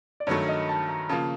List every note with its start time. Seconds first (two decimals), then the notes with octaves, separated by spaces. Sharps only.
0.20 D5
0.27 G2 D#3 F#3 A3 C#5
0.48 D#5
0.69 A5
0.89 A#5
1.09 C#3 F3 A#3 A5